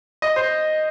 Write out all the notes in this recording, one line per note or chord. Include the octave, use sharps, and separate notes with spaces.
D#5
C5